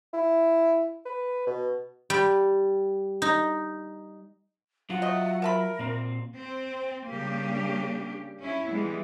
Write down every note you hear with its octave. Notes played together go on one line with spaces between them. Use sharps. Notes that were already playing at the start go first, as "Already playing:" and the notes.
E4
B4
B2
G3
D#4
F#3 F4 F#5
A3 D#5
A#4 E5 A5 B5
A#2 C4
C4
C#3 G3 A#3 D4 G4
C#4 E4
E3 G3 G#3 B3